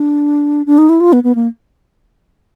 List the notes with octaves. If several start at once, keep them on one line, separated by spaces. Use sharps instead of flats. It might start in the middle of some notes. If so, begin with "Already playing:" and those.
Already playing: D4
D4
D#4
E4
F4
B3
B3
A#3